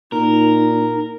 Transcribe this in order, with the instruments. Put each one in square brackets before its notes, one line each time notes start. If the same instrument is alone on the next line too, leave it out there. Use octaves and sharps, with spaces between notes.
[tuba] A#2 [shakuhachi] D#4 [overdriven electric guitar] A#4